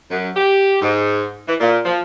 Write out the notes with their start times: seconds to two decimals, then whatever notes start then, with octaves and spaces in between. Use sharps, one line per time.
0.10 F#2
0.35 G4
0.81 G#2
1.47 E3
1.59 A#2
1.84 F3